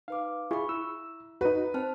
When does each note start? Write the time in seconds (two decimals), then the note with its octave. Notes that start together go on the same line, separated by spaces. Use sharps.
0.08 D#4 B4 F5 D6
0.51 E4 F4 G#4 B5 C#6
0.69 E4 E6
1.41 D#4 F#4 B4
1.74 C4 C5 A5 F6